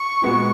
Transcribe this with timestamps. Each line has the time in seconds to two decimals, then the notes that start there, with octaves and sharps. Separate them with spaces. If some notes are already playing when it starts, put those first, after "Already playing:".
Already playing: C#6
0.22 A#2 G#3 B3 F#4